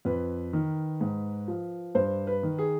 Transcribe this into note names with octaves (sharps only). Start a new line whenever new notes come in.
F2 B4
D#3
G#2
F3
G2 C5
B4
D#3
G#4